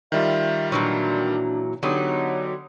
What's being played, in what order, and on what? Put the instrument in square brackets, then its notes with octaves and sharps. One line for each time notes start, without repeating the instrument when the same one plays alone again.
[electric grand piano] D#3 G3 F4 [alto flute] E5
[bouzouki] A#2 E3 F#3 [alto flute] D4
[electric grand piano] D3 G4 D#6 [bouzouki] F#3 B3 D#4 [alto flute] C#5